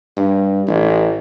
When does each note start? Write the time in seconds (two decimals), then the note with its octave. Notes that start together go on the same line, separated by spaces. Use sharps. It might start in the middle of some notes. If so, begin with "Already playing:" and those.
0.17 G2
0.68 A1